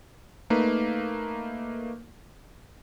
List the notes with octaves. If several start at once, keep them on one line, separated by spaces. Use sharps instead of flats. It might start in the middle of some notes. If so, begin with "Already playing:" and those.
A3 A#3 D#4 B4